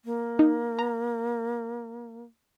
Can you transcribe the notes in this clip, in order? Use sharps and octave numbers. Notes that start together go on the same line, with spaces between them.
A#3
D#4
A#5